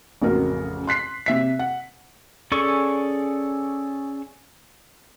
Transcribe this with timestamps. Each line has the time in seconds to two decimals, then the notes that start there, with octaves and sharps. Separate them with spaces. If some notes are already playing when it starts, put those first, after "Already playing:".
0.22 A1 F2 C#3 F#4 A#4
0.87 C6 F#6 B6 C7
1.26 C3 E5 B6
1.59 F#5
2.52 C#4 G#4 A4 D5 C#6